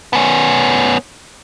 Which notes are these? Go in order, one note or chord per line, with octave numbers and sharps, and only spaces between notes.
B3 C#4